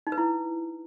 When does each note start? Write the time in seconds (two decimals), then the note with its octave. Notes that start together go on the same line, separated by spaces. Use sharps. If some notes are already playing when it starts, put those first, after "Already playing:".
0.07 D#4
0.12 B4
0.18 E4